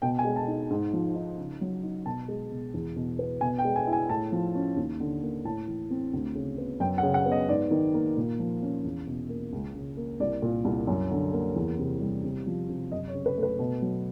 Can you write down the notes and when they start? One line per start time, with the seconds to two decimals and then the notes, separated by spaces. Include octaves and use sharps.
0.02 B2 G5
0.19 G#5
0.25 G#3
0.36 A5
0.47 D#4
0.70 G#2
0.93 F3
1.15 D#4
1.37 C#3
1.61 F#3
1.83 D#4
2.06 B2 A5
2.28 G#3
2.52 B2
2.74 E2
2.96 B2
3.19 B3
3.41 B2 G#5
3.58 G5
3.65 G#3
3.76 G#5
3.87 E4
3.93 G#5
4.09 A2 A5
4.32 F3
4.55 C#4
4.77 D#2
5.00 D3
5.22 A#3
5.45 A2 A5
5.67 E3
5.90 C4
6.13 D2
6.35 C#3
6.58 B3
6.80 F#2 G5
6.98 F#5
7.03 C#3
7.14 F#5
7.26 B3
7.32 D#5
7.49 G#2 D5
7.71 D#3
7.94 A#3
8.17 A#2
8.39 F3
8.62 C#4
8.84 E2
9.07 B2
9.29 A#3
9.53 C#2
9.75 C#3
9.97 A#3
10.20 C2 D5
10.42 A#2
10.65 C2
10.87 F#2
11.11 D3
11.33 A#3
11.56 E2
11.79 C3
12.01 G3
12.24 C3
12.47 F3
12.69 C3
12.92 F#2 D#5
13.08 C#5
13.15 C#3
13.26 B4
13.37 A3
13.43 B4
13.59 B2
13.82 F#3